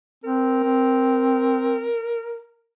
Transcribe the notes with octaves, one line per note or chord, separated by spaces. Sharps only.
C4 A#4
C4